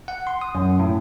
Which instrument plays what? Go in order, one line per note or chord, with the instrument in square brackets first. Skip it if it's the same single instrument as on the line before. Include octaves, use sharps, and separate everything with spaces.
[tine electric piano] F#5
C6
D#6
F#2
A2